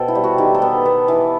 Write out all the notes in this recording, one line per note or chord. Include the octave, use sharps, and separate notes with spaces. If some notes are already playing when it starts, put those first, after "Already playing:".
Already playing: B2 A4 C5 G5
E4
G3
F#4
D#3 G4
A4
B3
B3
E3